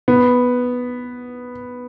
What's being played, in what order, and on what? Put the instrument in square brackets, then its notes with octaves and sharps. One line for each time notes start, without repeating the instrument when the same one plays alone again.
[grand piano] B3